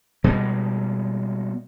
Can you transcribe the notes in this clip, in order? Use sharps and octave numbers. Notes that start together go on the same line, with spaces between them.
B2 G3 G#3 B3